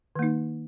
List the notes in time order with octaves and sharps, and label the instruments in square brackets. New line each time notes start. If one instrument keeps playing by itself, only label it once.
[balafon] D#3
A#3
D#4